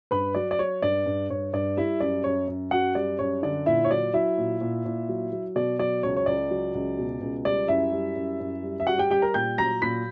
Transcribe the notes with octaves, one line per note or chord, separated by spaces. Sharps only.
G2 B4 B5
F#3 D5
D5
F#3 C#5
G2 D5
G2
G2 C#5
G2 D5
G3 E4 E5
F#2 D5
F#2 C#5
F#2
F#2 F#4 F#5
G3 D5
F#2 C#5
D3 D5
A#2 E4 E5
C#5
F#3 D5
F#3 E4 E5
A#2
A#2
A#2
F#3
F#3
B2 D5
F#3 D5
C#2 C#5
C#5
C#2 D5
F#3
C#2
B2
C#2
G3 D5
F#2 E4 E5
G3
F#2
F#2
G3
E5
G3 F#4 F#5
G4 G5
G3 G4 G5
A#4 A#5
A#2 G5 G6
F#3 A#5 A#6
A#2 B5 B6